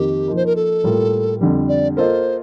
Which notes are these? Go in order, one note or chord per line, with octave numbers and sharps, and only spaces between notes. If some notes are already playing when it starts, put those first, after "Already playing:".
Already playing: F2 D#3 A#3 G4
F3 A#3 D#4
C5
A#4
A4
A2 G3 A#3 F4 A#4
F2 D3 G3
D5
A#3 F4 A4 C5 D#5